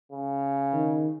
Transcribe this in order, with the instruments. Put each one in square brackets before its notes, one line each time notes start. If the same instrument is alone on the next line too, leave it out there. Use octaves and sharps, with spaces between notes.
[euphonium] C#3
[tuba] D#3